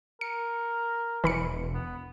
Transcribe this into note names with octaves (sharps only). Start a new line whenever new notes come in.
A#4 C#7
E1 E3 B5 C#7
B3